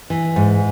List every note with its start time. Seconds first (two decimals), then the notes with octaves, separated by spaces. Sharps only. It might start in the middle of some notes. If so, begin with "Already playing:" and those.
0.10 E3
0.36 G#2